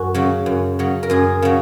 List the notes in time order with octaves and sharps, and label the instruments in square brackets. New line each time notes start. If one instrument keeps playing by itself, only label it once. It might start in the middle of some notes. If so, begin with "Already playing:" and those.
Already playing: [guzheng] F#2 F#4
C#3 F#3
F#2
C#3 F#3
A#4
F#2 G#4
C#3 F#3